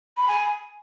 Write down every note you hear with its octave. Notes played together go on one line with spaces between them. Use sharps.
B5
G#5